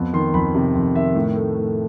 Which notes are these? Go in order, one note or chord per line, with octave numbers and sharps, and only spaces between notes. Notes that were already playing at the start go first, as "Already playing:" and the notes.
Already playing: F2 B3
D#3 C6
F2 B5
C3
F2
D#3 E5
A2
A3
A2